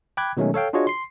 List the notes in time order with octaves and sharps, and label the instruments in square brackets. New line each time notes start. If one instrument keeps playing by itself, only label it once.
[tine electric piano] G5 B5 D6 F#6 G#6
B2 D#3 F#3 G#3 A3 C#4
A4 C#5 F5 G5
D4 F4 F#4 G#4 C#5 D#5
C6 C7